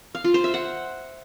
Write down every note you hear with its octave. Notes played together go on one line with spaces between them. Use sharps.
F5
F4
C5
E5
F#5